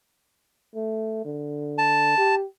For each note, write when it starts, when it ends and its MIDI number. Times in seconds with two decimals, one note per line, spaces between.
0.75 1.21 57
1.25 2.16 50
1.78 2.35 81
2.18 2.44 67